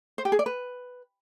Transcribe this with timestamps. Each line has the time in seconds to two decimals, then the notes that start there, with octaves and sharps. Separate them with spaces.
0.18 C5
0.25 G4
0.32 G#4
0.39 D5
0.46 B4